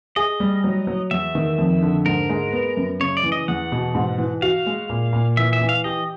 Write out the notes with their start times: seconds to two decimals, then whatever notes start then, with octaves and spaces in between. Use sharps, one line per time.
0.16 G#4 D#5
0.40 G3
0.64 F#3
0.87 F#3
1.11 E2 E5
1.35 D#3
1.58 F2
1.82 D3
2.05 G#2 A#4
2.29 G#3
2.52 B3
2.77 F#2
3.00 C#3 C#5
3.17 D5
3.23 E3
3.32 D#5
3.48 E2 F#5
3.72 B2
3.95 G#2
4.18 E3
4.42 F#4 F5
4.66 G#3
4.89 A#2
5.13 A#2
5.37 E3 E5
5.53 E5
5.61 E3
5.69 F5
5.84 G4 D#5